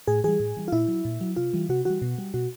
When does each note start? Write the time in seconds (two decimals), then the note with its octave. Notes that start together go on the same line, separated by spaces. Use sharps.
0.07 A2 G#4
0.24 E3 G3 G#4
0.40 A2
0.57 E3 G3
0.68 F4
0.72 A#2 E4
0.88 F#3
1.05 A#2
1.21 F#3
1.36 C3 F4
1.53 E3 G3
1.69 C3 F#4
1.85 E3 G3 F#4
2.02 B2
2.18 G3
2.34 B2 F#4